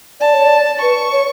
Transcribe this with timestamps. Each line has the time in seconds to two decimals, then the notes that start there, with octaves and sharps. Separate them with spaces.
0.20 D5 A5
0.34 C#5
0.46 D5
0.81 B4 C#6
1.12 C#5